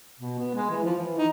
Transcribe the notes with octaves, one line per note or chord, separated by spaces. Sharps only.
B2
B3
G#3
E3
F3
E3
D#4